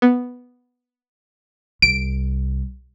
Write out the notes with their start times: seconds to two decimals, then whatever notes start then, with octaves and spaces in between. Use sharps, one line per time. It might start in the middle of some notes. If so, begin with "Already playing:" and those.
0.02 B3
1.82 C2 D7